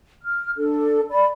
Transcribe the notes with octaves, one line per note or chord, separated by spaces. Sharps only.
F6
D4 A4
D5 B5